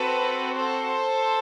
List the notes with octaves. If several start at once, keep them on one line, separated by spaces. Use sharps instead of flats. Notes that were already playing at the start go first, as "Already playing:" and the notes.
Already playing: C4 F#4 A4 B4
A4 C5